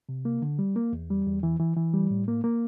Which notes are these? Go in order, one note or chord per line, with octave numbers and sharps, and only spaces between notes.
C3
A#3
D3
G3
A#3
E2
G3
E2
E3
E3
E3
G3
A2
A#3
A#3